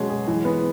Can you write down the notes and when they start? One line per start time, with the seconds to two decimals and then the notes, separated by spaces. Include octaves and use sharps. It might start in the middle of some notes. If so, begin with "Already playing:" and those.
Already playing: B2 F#3 G#3 C#4
0.10 G#4
0.27 E3
0.45 B3